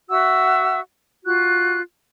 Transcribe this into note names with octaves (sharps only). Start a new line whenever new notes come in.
F#4 E5 F#5 E6
F4 F#4 F#6